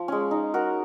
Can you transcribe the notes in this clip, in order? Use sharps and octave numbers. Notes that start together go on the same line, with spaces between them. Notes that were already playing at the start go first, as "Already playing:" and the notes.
Already playing: F3
G#3 C#4
D#4
F#4 A#4